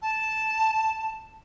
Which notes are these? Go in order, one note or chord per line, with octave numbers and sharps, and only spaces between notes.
A5